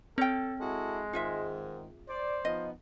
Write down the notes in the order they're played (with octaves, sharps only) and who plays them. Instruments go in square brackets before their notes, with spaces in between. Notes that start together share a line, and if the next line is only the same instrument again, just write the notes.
[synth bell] C4 [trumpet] A4 [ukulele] C#5 G5
[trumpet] G#3 [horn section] E4 F#4 A4
[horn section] G#2 D#3 [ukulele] F4 G#4 E5
[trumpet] C5 [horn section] D5
[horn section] F3 B3 D#4 [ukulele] D#5